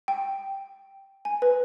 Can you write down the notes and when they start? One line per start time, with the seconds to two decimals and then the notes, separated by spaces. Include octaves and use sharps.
0.08 G5
1.25 G#5
1.42 B4